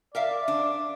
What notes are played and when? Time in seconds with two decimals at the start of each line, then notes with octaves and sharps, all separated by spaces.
0.15 A#4 D5 E5 F5
0.48 D4